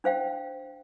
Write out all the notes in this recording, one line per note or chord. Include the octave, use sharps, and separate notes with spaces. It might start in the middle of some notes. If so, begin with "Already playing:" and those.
D4 C5 F5 G5